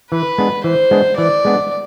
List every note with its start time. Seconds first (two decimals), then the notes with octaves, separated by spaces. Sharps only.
0.11 E3 B4
0.38 G#3 B3 D4
0.64 E3 C5
0.91 G#3 B3 D4
1.17 E3 D5
1.45 G#3 B3 D4